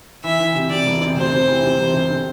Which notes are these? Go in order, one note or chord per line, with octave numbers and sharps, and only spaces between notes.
E3 E5
E3
C3
C3 D5
E1
C3
D2 C5
C3
E3
C3
E1
C3
D3